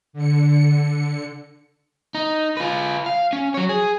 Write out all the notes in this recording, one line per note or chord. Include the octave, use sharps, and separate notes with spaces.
D3 C#7
D#4
F4 B4
F5
C#4
F#3 C#5
G#4